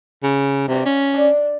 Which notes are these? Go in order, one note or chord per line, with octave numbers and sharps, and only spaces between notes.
C#3
G2 C3 A#3 F#4
C#4 F4
D4